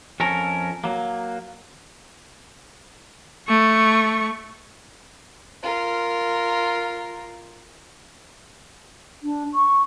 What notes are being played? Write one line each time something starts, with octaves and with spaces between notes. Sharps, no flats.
F2 C#4 A4 A#4
F#3 A#3
A3 C#6
F4 A#4
D4
C#6